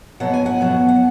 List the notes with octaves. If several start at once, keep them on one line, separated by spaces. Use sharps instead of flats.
B2 F#3 B3 F#5
G#5
F#5
B2 F#3 B3
F#5